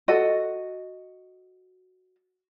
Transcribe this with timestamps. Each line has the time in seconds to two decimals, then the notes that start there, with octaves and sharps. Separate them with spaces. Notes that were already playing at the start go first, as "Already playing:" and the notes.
0.08 F#4 A4 D#5